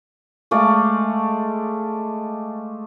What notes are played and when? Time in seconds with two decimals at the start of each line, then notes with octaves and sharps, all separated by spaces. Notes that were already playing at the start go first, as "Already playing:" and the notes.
0.51 G#3 A3 D5 F5